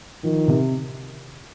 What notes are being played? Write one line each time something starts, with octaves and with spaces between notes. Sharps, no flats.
D#3 F3
C3